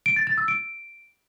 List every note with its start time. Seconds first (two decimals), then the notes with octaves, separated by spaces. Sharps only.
0.06 D7
0.16 A6
0.27 A6
0.38 E6
0.48 D7